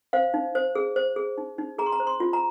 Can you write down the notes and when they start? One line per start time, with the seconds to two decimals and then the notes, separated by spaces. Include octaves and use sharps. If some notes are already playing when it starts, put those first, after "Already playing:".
0.13 C5 F5
0.34 D#4
0.55 C5
0.75 G#4
0.96 C5
1.16 G#4
1.38 D#4
1.58 D#4
1.78 G#4 A#5
1.86 C6
1.92 A#5
2.00 C5
2.07 C6
2.20 F4
2.33 A#5